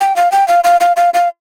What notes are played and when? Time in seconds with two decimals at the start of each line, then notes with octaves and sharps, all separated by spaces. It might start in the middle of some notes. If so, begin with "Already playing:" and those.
0.01 G5
0.16 F5
0.32 G5
0.48 F5
0.64 F5
0.81 F5
0.96 F5
1.14 F5